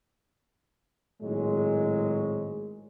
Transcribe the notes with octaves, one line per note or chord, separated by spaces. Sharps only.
G#1 A2 F#3 G#3